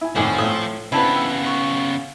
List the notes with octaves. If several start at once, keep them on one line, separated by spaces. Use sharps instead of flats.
E4 G#5
F1 A2 D#3 F3 G#4 C5 D5
A2 A3 D#6
C#3 B3 C4 D4 E4 B4 A5
G5 E6
C#6